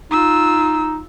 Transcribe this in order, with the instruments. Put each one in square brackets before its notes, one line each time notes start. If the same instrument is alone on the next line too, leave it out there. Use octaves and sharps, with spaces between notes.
[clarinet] D#4 [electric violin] F4 E6